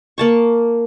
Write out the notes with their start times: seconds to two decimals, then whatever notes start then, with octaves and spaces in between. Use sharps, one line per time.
0.18 A#3 A5 C#6